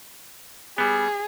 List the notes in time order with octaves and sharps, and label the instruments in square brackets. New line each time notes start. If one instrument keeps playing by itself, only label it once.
[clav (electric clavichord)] G3 B3 [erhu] G#4